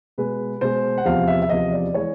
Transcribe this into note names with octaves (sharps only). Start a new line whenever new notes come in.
B2 G#3 B4
B2 G#3 C5
F#5
E2 C3 F3 F5
E5
E5
E2 C3 F3 D#5
D5
E3 G#3 C#5